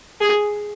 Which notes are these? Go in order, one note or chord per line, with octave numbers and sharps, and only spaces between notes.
G#4